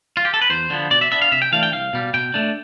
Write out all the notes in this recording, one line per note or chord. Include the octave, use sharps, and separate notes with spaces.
F4
G4
A4
B4
E2 C5
D3 F3 B3
B2 D5
E5
B3 D4 E5
F5
C3 E5
G5
E3 A3 D4 F5
G5
C2 F5
B2 G3
B2 G5
A3 D4